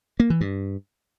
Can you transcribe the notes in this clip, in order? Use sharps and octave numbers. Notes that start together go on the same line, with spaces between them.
A#3
E3
G2